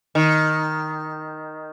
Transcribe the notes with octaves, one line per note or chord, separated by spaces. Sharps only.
D#3